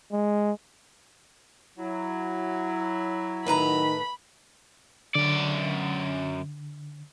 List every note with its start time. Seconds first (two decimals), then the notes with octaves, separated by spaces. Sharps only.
0.12 G#3
1.78 F#3 E4
3.46 A2 D#3 B4 A#5 B5
5.15 F#2 D3 D5